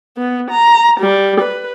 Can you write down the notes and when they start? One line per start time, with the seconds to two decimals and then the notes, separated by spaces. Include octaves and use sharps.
0.18 B3
0.51 A#5
1.01 G3
1.41 B4